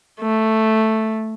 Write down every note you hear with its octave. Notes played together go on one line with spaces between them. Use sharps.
A3